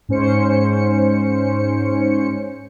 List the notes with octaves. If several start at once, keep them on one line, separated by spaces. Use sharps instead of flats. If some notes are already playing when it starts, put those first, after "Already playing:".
G#2 C#4 C5 C#7